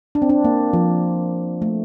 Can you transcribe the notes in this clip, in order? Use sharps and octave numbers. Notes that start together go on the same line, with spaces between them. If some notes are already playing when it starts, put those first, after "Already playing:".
D4
C4
D4
A#3
F3
A3